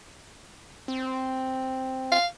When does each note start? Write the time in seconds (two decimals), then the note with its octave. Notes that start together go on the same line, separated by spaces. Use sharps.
0.88 C4
2.12 F5